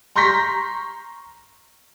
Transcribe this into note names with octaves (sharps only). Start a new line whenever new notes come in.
A#5 C6 C#6 G6 A#6 B6